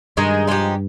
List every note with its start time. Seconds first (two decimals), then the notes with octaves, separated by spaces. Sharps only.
0.17 G2 D#3 G#3 D#4 G#4
0.48 F3 G#3 D#4 G4